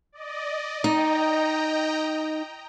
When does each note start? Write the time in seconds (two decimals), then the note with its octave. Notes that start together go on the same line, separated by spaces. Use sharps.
0.12 D5 D#5
0.84 D#4 D#5 G5 A#5